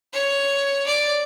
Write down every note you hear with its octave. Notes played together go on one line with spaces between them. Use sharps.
C#5
D5